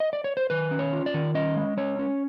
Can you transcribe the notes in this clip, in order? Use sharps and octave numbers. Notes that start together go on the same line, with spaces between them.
D#5
D5
C#5
C5
D#3 B4
C#4
C#5
F4
D5
D#3
C#4 D#5
G#3
C#4 C#5
C#4